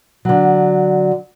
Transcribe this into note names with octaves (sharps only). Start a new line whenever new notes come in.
D3 F#3